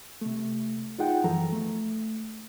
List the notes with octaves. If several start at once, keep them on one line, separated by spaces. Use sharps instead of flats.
C3 A3
D#4 F4 G#4 F#5 G5
F#2 E3 F3 A4 A#5
A3